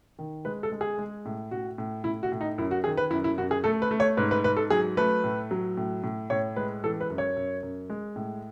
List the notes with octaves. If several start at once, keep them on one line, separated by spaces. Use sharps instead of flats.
D#3
G#3 B4
A4
G#3
G#4
G#3
A2
A2 F#4
A2
A2 E4
F#4
A2
D#4
F#2 E4
F#4
D#3 G#4
B4
F#2 E4
E4
F#2 F#4
G#4
A3 A4
B4
A3
C#5
G#2 B4
B4
G#2 B4
A4
F#3 G#4
A3 B4
A2
F#3
A2
A2
A2 C#5
G#3 B4
E3 A4
B4
F#2
C#5
F#2
F#2
G#3
A2